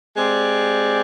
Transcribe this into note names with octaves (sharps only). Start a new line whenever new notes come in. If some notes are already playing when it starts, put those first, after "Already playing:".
G#3 C4 G4 D5